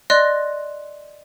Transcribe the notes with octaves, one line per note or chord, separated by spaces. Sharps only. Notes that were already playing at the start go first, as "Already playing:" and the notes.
D5 D#5 C6 F#6 A#6